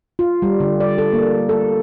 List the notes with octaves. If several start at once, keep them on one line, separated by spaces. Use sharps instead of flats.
F4
G3
D3
D5
A4
A#3
A4